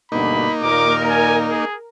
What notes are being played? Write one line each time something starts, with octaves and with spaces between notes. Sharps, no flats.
D2 G2 B2 A#3 D#4 B5
D#2 A#2 A#4 D6
G#5
G#4